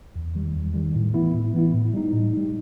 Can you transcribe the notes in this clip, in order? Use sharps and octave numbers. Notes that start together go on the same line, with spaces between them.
E2
D#3 G3
E2
D#3 G3
A2
E3 B3 E4
A2
E3 B3 E4
A2
G3 D#4
A2
G3 D#4